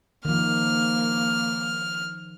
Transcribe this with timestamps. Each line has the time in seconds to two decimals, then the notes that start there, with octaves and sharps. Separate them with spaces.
0.25 D#3 F3 A#3 F6